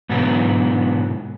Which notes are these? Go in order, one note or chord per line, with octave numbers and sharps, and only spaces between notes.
G#2 B2 D3 E3 F#3 B3